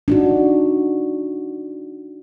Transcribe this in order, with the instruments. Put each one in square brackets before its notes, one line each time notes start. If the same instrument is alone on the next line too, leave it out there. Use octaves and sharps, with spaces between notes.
[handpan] D4 D#4 F#4